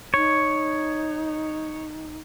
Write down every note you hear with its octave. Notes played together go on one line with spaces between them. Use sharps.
D#4 C#5